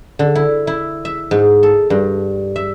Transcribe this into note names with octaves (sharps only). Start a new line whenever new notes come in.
D3
E4
E4
E5
G#2
A4
G2
E5